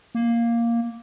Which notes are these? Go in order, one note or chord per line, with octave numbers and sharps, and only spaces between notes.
A#3